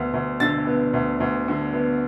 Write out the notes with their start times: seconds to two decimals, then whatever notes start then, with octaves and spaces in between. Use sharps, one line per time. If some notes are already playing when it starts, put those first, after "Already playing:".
Already playing: D2 B3
0.14 D2
0.40 D3 A6
0.67 B3
0.93 D2
1.20 D2
1.48 D3
1.74 B3